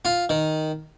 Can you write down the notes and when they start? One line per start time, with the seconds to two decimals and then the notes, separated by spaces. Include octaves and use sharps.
0.05 F4
0.30 D#3